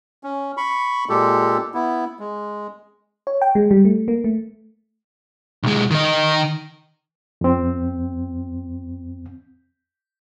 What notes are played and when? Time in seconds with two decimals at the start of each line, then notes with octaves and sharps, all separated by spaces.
0.24 C#4
0.57 B5 C#6
1.09 A#2 G#3 G4 A4
1.74 B3 E4
2.19 G#3
3.27 C#5
3.41 G5
3.55 G#3
3.71 G3
3.85 A3
4.08 A#3
4.24 A3
5.63 B1 G#3
5.91 D#3 D#5
7.41 F2 C4